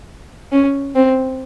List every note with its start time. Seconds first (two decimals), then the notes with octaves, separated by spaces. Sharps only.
0.52 C#4
0.95 C4